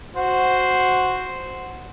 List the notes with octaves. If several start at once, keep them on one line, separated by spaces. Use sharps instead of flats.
F#4 C5